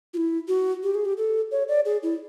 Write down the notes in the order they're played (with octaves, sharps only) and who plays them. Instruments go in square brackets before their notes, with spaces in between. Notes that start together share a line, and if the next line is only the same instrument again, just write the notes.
[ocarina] F4
E4
F#4
G4
G#4
G4
A4
C#5
D5
G#4
E4